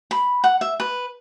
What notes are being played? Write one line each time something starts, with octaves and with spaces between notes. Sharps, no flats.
B5
F#5
E5
B4